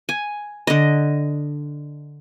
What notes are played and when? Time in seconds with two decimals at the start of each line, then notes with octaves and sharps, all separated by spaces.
0.09 G#5
0.67 D3 D#5